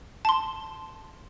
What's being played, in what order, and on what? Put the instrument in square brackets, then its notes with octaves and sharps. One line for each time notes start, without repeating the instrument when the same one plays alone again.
[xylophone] A5 C6